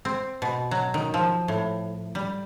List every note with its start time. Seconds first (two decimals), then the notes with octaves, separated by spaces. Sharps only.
0.05 C4
0.42 B2
0.71 F#3
0.94 D#3
1.14 F3
1.48 A2
2.15 G3